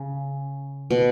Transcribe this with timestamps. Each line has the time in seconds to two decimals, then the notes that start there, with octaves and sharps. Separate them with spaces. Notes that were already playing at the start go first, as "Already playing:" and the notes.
Already playing: C#3
0.91 B2